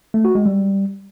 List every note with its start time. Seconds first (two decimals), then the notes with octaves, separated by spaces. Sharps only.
0.14 A3
0.25 F#4
0.35 G#3
0.46 G3